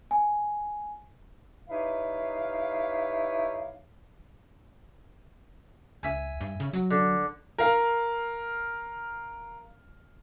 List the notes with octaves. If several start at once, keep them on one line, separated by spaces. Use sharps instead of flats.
G#5
D#4 E4 G4 B4 C#5 F5
C#2 E5 G#5
G2
C#3
F#3
D3
A#4 F5